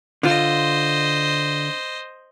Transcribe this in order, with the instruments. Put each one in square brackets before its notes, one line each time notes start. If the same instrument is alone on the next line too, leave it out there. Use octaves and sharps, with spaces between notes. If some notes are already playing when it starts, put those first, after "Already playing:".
[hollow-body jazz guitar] D3 F4 [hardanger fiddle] C5 D#5